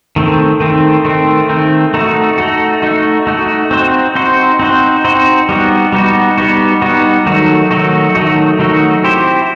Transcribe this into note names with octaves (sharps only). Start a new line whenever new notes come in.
D#3 A3 C4
D#3 A3 C4
D#3 A3 C4
D#3 A3 C4
A3 D#4 F#4
A3 D#4 F#4
A3 D#4 F#4
A3 D#4 F#4
C4 D#4 F#4 C5
C4 D#4 F#4 C5
C4 D#4 F#4 C5
C4 D#4 F#4 C5
G3 B3 D#4 F#4
G3 B3 D#4 F#4
G3 B3 D#4 F#4
G3 B3 D#4 F#4
D#3 F#3 A3 D#4 F#4
D#3 F#3 A3 D#4 F#4
D#3 F#3 A3 D#4 F#4
D#3 F#3 A3 D#4 F#4
C4 E4 G4 C5